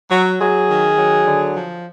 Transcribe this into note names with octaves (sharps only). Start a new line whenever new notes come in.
F#3
F#3 G#4
D#3
F#3
D3
F3